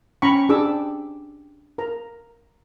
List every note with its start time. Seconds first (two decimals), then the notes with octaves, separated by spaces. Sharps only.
0.22 C#4 G5 A#5 B5 C#6
0.49 D4 G4 G#4 D6 E6
0.66 G5
1.78 A#4 A#5